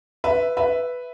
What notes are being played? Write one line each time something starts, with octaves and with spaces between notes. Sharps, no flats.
B4 E5
B4 E5